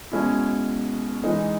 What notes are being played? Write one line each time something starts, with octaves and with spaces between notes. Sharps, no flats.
B2 G#3 C#4 E4
E3 G#3 D#4